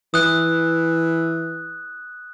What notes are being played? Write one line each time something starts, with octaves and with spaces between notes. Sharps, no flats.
E3 D#6 F#6